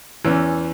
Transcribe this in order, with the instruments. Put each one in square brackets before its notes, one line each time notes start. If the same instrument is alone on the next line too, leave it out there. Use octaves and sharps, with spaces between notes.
[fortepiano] E2 E3 C#4